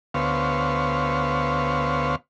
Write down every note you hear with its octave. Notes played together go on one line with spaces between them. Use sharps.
D2 B3 C5 C#5 F5